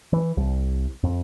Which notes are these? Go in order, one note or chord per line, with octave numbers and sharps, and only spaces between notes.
E3
C2
F2